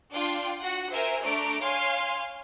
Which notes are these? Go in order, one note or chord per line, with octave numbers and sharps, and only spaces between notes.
D4 F4 G5
F#4 F#5
A#4 C5 E5 G#5
A3 D4 A#5 D7
C#5 F5 G#5 C6 F6